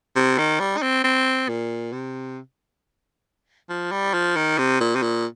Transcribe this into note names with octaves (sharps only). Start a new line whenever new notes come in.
C3
D#3
G3
D#4
C4
C4
A#2
C3
F3
G3
F3
D#3
C3
A#2
C3
A#2